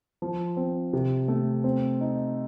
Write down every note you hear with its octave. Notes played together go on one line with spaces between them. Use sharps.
F3
C4
C3
A3
C4
D#4